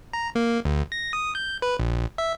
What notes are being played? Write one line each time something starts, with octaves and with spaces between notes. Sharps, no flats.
A#5
A#3
D2
A#6
D#6
G6
B4
A#1
E5